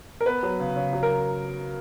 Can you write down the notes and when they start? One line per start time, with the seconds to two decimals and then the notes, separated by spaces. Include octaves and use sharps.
0.21 A#4
0.26 B3 B4
0.43 F#3
0.60 C#3
0.76 C#3
0.93 F#3
1.03 A#4